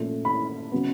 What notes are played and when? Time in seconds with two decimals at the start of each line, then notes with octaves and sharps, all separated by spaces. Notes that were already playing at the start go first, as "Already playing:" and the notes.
Already playing: A#2 F3 A3 C#4
0.25 B5
0.72 C#3 F#3 B3